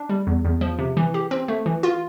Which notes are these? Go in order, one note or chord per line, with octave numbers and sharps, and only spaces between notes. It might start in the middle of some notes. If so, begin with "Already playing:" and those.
Already playing: D4
G3
E2
E2
F3
C3
E3
G4
C4
A3
E3
F4